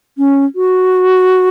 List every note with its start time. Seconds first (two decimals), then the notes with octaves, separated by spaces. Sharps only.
0.18 C#4
0.55 F#4